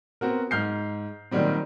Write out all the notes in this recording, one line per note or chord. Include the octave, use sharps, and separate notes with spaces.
B3 C4 F#4 A#4
G#2 F6 G6 C7
A#2 D#3 F#3 G3 C4